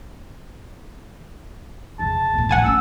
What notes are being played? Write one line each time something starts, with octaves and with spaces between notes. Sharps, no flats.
F2 C#3 A5
A2 B3
A2 E3 F#5 G#5 A5
A3 C#4 E6